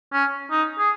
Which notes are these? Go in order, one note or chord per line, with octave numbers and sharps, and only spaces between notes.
C#4
D#4
G#4